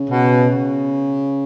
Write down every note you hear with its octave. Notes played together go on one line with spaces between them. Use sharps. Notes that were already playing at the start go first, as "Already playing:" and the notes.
Already playing: C#3
B2